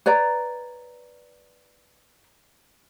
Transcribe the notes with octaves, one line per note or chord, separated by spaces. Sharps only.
B4 C#5 D5 A#5